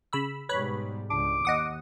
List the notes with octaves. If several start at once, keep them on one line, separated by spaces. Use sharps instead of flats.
C#3 B5 E6
G#2 B2 G3 B4 C#5 B5
C#2 D4 D6
D#2 D#5 F#5 D#6